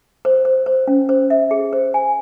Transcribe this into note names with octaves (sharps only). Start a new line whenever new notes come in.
C5
C5
C5
C#4
C5
E5
G#4
C5
G#5